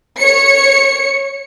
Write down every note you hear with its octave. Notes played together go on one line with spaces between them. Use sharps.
C#5 C#7